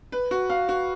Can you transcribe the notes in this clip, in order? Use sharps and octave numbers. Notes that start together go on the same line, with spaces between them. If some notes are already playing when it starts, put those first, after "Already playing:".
B4
F#4
F5
F#4